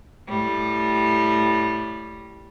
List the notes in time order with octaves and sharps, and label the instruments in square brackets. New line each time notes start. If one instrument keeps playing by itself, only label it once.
[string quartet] A2 G3